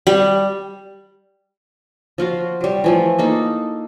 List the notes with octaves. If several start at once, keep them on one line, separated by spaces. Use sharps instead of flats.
G3
F3 F4 F#4
F#3 G3
E3 F3 A3
A#3 D#4 A4